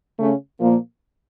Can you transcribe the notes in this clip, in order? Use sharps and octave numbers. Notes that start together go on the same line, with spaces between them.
C#3 A3 C#4
A#2 F3 A#3